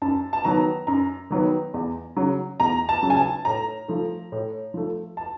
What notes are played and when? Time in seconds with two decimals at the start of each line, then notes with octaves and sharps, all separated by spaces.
0.02 F#2 A5
0.33 A5
0.45 D#3 F#3 B3 A#5
0.87 F#2 A#5
1.30 D#3 F#3 B3
1.74 E2
2.16 C#3 F#3
2.60 E2 A#5
2.89 A5
3.03 C#3 F#3
3.10 G#5
3.17 A5
3.45 A2 A#5
3.88 F3 A3
4.32 A2
4.74 F3 A3
5.17 A5